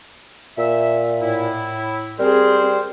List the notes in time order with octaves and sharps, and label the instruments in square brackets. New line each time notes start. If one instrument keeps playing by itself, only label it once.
[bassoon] A#2 [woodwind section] E5
[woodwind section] A2 E4
[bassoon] G3 [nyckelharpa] C4 G#4 [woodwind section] A#4 C5